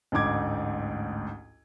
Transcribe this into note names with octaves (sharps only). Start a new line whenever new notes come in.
A1 D2 G#2 D6 G#6